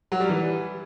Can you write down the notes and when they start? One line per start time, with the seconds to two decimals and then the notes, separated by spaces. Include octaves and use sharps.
0.12 F#3
0.20 G3
0.29 E3